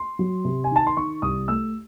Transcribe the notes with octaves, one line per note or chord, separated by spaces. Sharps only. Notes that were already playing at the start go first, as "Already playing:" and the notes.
Already playing: C6
F#3
C3
G#5
D#3 A5
C6
D#3 C#6
C2 D#6
A3 E6